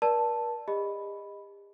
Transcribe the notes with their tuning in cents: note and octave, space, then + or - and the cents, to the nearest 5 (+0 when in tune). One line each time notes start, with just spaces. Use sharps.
A#4 +45 D5 +0 A5 +0
G4 +45 D#5 +0 B5 +0